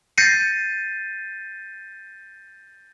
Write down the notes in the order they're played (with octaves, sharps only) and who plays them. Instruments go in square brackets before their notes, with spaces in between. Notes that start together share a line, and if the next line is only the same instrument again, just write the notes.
[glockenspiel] G6 A6 A#6 C7 C#7 D#7